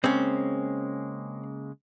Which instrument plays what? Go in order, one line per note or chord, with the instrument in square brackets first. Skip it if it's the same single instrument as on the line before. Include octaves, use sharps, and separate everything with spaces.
[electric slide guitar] C#3 G#3 A#3 [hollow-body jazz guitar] C4 C#4